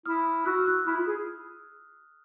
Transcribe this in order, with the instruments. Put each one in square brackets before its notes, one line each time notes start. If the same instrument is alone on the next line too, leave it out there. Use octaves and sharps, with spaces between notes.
[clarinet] E4 [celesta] D#6 F6
[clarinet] F#4 [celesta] E6 F#6
[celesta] F6
E6 F#6
[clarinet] E4 [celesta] D#6 F6
[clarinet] F4
G#4